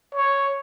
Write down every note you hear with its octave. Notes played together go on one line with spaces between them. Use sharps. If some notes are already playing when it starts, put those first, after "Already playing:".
C#5